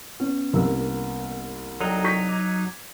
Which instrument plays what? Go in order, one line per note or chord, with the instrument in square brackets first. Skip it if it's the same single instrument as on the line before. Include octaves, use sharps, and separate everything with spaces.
[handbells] B3 [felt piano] C#4
[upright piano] C2 A#3 E6
[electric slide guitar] F#3 D#4 [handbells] A4 D5 G5
[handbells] F#4 [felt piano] C#6 A#6 B6
[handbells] D6 G#6